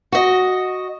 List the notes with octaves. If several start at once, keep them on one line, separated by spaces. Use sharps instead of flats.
F#4 D#5